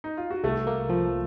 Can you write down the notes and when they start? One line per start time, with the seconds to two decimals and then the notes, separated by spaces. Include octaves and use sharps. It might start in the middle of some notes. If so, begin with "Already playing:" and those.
0.04 D#4
0.17 F4
0.30 F#4
0.44 C2 A3 A4
0.67 A#3
0.89 F3